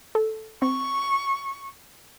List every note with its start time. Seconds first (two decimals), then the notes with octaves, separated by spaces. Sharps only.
0.15 A4
0.62 C4 C#6